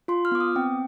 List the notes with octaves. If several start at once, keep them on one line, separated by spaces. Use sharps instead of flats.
F4 C6
F6
B3 D6
D#6
C4 G5